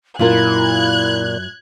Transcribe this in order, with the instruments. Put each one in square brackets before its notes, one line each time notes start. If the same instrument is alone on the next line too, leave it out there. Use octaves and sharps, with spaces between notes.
[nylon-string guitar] F#2 F4 A#4 [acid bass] A#2 [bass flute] E4 [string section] F#6 G#6